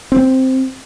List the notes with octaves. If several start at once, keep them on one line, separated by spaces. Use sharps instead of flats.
C4